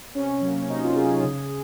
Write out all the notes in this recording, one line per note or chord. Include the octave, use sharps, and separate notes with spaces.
C3 C#4
F#3 A#3
C3 D#4
F4
F#3 A#3 G#4
G#4
C#3